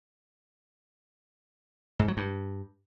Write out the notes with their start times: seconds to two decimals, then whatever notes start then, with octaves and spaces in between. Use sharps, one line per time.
1.99 G#2
2.08 F#3
2.17 G2